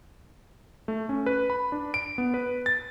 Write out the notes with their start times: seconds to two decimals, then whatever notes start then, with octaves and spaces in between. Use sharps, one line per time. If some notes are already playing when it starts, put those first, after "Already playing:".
0.88 A3
1.09 C#4
1.26 B4
1.50 B5
1.72 D4
1.94 D7
2.18 B3
2.34 B4
2.66 A6